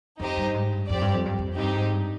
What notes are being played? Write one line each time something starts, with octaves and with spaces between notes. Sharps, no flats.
F2 D#4 G4 C5 D#5
G2
G#2
G2
F2 C4 G4 D5
G2
F2
G2
F2
G2 C4 D#4 G4
G#2
G2